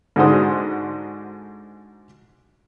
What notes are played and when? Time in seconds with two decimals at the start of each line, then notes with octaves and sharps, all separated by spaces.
0.16 G#2 D3 D#4 F#4 C5 D#6